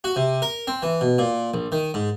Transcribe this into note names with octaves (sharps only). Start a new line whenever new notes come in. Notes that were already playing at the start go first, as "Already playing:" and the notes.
F#4
C3
A#4
C4
E3
B2
A#2
A#1
D#3
G#2